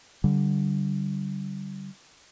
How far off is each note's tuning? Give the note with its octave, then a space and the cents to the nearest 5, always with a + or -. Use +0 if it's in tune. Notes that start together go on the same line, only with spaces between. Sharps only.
D3 -15 G3 -25